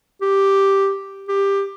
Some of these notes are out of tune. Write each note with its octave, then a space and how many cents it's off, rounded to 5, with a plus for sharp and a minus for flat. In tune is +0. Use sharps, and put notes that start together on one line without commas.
G4 +0
G4 +15